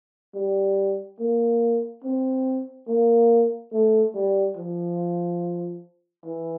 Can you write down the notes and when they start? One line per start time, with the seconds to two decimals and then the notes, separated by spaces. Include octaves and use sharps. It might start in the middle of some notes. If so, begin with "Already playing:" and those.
0.35 G3
1.20 A#3
2.04 C4
2.88 A#3
3.72 A3
4.15 G3
4.57 F3
6.26 E3